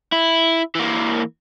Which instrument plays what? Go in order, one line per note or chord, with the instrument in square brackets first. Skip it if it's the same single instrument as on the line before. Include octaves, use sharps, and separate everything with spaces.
[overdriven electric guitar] E4
E3 A#3